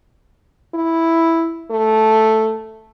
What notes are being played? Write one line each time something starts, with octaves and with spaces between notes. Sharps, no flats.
E4
A3